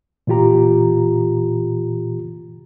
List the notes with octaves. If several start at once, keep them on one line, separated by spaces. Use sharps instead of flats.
A#2 E3 F4 G4 A#5